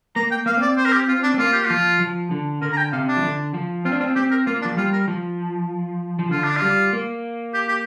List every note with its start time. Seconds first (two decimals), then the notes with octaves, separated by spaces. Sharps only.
0.16 A#3 A#5
0.31 G5
0.46 A#3 F5
0.57 C4
0.62 D5
0.77 C5
0.85 A#4
0.93 G4
1.08 F4
1.23 D4
1.34 C4
1.38 A#3 F4
1.53 G4
1.66 F3 F4
2.00 F3
2.31 D3
2.62 D3 A#4
2.73 A#5
2.77 G5
2.92 C3 F5
3.08 D4
3.17 F3
3.23 D3
3.54 F3
3.85 C4 F4
3.92 D4
4.00 C4 F4
4.16 C4 G4
4.31 A#4
4.46 A#3 F4
4.62 D4
4.65 F3
4.77 G3 F4
4.93 A#4
5.08 F3
6.19 F3
6.31 D3 F4
6.44 D4
6.56 F4
6.62 G3
6.93 A#3
7.54 G4
7.68 G4